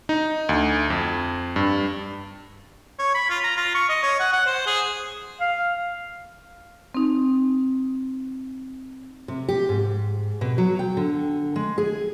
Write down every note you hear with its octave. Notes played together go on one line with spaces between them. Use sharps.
D#4
D2
F2
G2
C#5
B5
F4
A#5
F4
C#6
D#5
C#5
F#5
F#5
C5
G#4
F5
C4 D#4
C3
G4
G#2
B2
F#3
G5
D3
G#3
G#4